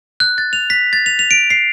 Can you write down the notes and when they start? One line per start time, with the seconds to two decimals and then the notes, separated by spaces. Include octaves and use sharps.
0.20 F#6
0.38 A6
0.53 F7
0.70 B6
0.93 A6
1.06 F7
1.19 F7
1.31 D7
1.50 C7